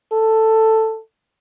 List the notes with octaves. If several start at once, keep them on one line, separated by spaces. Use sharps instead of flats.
A4